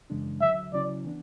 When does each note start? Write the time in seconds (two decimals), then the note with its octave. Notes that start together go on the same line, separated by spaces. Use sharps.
0.10 F#2 C#3 E3 G#3 D4
0.41 D2 D3 F#3 E5
0.72 C#3 F#3 C#4 E4 D5
1.05 E3 B3 D4